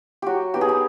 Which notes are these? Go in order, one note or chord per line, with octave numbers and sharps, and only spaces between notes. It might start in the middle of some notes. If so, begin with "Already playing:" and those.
F#3 F#4 G4
B3 D#4 G4
G#4
G4